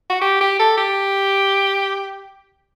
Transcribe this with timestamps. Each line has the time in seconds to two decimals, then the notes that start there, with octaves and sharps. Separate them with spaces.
0.10 F#4
0.21 G4
0.41 G4
0.60 A4
0.78 G4